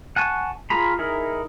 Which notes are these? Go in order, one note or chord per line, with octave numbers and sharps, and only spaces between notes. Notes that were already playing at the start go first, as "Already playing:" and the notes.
F#5 G#5 A5 C#6
F4 G#4 A#5 B5
D#4 E4 G#4 A#4 E5